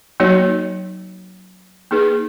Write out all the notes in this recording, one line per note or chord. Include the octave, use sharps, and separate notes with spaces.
F#3 A#3 D#4 F#4 C#5
A#3 D#4 G#4 B4